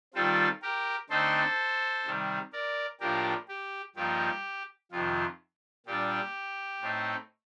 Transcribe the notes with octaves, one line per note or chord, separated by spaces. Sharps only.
D#3 G3 C4 F4 A4
G4 A#4
D3 A3 C4 D#4 A4 C5
C3 D#3 G3
A#4 D5
A2 F3 A#3 D4 G4 A#4
G4
G2 F3 A#3 D#4 G4
F2 C3 D#3 F4
A#2 G3 D4 G4
A2 A3 C4 D#4